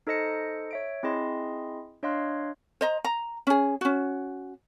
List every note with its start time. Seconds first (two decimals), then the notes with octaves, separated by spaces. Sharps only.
0.07 D#4 A4 C5 D#5 A#6 C#7
0.71 C#5 E5 D7
1.03 C4 E4 G#4 D#5 C6
2.03 D4 C#5 D#5 F5 C6 F#6
2.81 C5 D#5 A#5
3.04 A#5
3.47 C#4 G#4
3.81 C#4 F#4